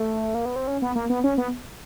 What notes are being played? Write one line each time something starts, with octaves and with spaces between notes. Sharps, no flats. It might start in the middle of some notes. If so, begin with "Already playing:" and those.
Already playing: A3
A#3
B3
C4
C#4
B3
A#3
B3
C#4
B3